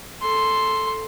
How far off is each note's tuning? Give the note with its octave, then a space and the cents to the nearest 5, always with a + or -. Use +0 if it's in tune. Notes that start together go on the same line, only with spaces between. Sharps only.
A4 +0 C6 +0